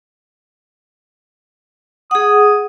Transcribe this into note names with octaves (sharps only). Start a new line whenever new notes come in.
G#4 F#5 D#6